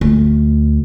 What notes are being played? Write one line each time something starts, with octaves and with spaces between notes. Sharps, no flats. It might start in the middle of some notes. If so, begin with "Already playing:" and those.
D2